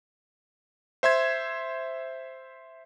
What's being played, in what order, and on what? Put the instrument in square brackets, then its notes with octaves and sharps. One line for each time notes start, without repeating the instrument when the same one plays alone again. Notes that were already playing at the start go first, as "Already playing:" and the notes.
[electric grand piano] C5 E5 C6 G#6